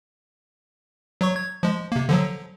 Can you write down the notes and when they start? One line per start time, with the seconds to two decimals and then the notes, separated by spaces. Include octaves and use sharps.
1.21 F#3 C#5 C#6
1.36 G#6
1.63 F3 G#3
1.92 C3 A#3
2.09 D3 F3 F#3